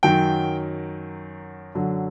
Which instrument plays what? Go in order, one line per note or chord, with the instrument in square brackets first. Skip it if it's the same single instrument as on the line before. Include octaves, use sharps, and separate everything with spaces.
[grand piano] F#2 D#3 F#3 G5
F#2 D3 F#3